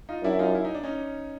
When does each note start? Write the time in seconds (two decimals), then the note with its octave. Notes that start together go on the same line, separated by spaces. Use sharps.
0.09 D#4 F4
0.24 F#2 D4 E4
0.39 D#4 F4
0.55 E4
0.65 D#4
0.75 D4
0.83 C#4 D#4